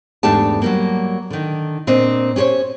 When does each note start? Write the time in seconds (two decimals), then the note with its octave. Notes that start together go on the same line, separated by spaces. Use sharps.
0.23 E2 G#2 A3 D4 G4 A5
0.62 F#3 G3 A#3
1.30 D3 D#3
1.87 A#2 C4 D4 D#5
2.36 C#4 G4 G#4 C5 C#5